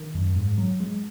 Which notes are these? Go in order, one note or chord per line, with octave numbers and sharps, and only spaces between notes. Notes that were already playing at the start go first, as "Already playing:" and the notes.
Already playing: D#3
F#2
G#2
F#3
G#3